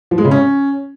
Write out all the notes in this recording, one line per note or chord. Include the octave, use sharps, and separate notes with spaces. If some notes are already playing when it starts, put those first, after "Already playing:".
F3
G#3
C#3
C#4